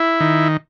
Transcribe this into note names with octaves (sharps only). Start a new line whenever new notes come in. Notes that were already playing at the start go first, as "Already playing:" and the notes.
Already playing: E4
D#3